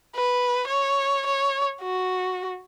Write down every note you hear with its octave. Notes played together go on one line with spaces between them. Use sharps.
B4
C#5
C#5
F#4